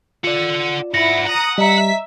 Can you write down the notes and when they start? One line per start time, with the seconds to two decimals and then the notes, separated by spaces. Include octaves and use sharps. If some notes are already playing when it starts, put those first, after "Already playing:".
0.24 F4 A4 D5 F#5
0.94 G#2 E4 F#5 A#6
1.26 F#5 A#5 D#6
1.58 G3 D#5 E5 A#5 B6